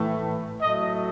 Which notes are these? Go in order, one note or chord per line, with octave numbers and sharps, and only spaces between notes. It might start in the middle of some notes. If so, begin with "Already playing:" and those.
Already playing: A2 E3 A3
A2 F#3 A3 D#5